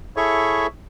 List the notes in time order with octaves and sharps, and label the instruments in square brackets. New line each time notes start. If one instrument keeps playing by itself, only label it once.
[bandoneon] E4 G#4 A4 C#5 E5 C#6